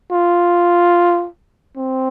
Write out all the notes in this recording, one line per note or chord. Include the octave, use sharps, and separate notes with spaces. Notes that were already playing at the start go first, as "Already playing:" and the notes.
F4
C4